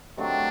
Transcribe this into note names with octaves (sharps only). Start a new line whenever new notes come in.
C3 D#3 F#3 A3 D4